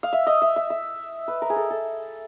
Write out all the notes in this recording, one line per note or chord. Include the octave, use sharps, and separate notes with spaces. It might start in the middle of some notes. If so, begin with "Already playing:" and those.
F5
E5
D#5
E5
E5
E5
B4
A#4
G#4
A4
A4